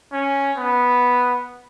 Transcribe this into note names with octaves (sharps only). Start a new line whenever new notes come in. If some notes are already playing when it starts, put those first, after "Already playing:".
C#4
B3